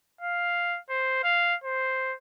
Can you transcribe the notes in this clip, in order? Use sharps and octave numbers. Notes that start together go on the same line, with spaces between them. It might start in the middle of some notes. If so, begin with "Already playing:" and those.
F5
C5
F5
C5